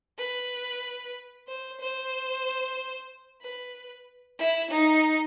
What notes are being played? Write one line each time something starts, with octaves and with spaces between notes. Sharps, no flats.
B4
C5
C5
B4
E4
D#4